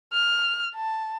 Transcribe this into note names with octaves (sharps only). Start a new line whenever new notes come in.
F6
A5